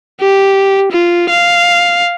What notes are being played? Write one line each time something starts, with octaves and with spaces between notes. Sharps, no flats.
G4
F4
F5